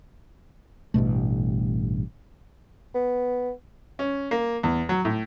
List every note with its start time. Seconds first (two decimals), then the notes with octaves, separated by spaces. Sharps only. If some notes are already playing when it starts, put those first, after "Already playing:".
0.94 A1 G2 B2 A3
2.95 B3
3.99 C#4
4.31 A#3
4.63 E2
4.89 F#3
5.05 A2